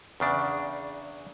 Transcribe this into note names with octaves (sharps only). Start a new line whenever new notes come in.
E2 C#3 D4